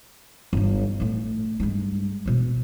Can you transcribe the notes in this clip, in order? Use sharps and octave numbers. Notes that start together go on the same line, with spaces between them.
G1 G2
A2 A3
G2 G#3
E1 B2